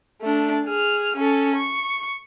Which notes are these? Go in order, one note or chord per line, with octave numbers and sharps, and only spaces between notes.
A3 D4
G#4 F6
C#4 A4
C#6